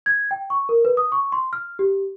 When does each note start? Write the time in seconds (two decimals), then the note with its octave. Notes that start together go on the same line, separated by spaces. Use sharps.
0.06 G#6
0.31 G5
0.50 C#6
0.69 A#4
0.85 B4
0.97 D#6
1.12 C#6
1.32 C6
1.53 F6
1.79 G4